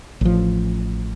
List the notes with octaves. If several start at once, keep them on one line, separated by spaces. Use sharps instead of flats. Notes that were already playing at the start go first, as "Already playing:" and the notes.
A1 F3